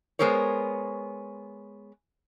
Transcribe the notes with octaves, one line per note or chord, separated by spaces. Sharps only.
G#3 B3 A#4 C5 C#5